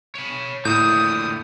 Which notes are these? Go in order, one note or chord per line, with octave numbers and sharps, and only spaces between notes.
C#5 B5
A2 D3 A#3 D#6 G6